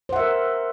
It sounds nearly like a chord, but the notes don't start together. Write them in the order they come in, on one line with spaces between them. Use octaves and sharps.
C5 F#5 E5 A#4